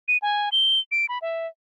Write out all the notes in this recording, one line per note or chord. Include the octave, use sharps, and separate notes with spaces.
D#7
G#5
G7
D7
B5
E5